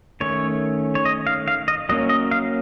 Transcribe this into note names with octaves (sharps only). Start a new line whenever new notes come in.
D#3 A3 C#4 C#5
C#5
D#5
F5
F5
D#5
F#3 A#3 C#4 D#5
D#5
F5